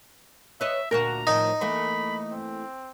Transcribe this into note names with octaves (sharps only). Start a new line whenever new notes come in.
B4 C#5 D#5 E5
D2 A#2 F#4 A#4 A#5
A2 D#3 F3 D#4
E3 A3 A#3 B5
C4